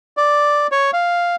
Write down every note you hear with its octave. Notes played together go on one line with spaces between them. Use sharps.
D5
C#5
F5